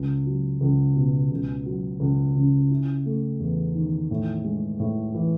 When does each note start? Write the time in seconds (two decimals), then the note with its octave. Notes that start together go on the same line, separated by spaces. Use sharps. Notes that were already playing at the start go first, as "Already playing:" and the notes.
Already playing: C#2
0.26 F#3
0.61 C#2
0.96 B2
1.31 C#2
1.66 F#3
2.00 C#2
2.36 C#3
2.71 E4
3.06 A3
3.40 E2
3.75 D#3
4.11 A2
4.44 G#3
4.80 A2
5.14 E3